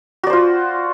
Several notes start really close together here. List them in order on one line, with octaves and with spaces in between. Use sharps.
F#4 D5 C5 F4